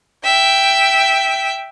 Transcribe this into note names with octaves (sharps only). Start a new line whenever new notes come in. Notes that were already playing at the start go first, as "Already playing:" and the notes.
E5 G5